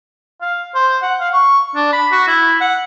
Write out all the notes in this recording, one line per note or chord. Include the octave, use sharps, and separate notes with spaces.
F5
C5
F#5
F5
C#6
D4
B5
F#4
E4
F#5